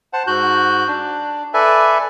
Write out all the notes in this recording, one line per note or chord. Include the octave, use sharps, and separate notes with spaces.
C5 F#5 A5
G#2 F#4 F#6 G6
D4
A4 B4 D5 E5 G#5